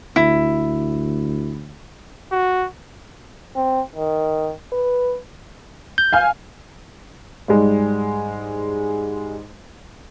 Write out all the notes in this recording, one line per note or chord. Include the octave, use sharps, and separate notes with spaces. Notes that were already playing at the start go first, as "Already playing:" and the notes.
D2 E4
F#4
C4
D#3
B4
G6
F5 G#5 F6
G#2 G3 G#3